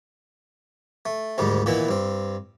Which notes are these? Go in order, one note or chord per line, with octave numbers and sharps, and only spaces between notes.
A3
D2 G#2 D#3 G3
A#2 D#3 E3 B3 E4
G2 C4